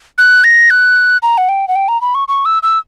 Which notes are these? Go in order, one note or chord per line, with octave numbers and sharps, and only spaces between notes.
F#6
A#6
F#6
A#5
F#5
G5
F#5
G5
A#5
B5
C#6
C#6
E6
E6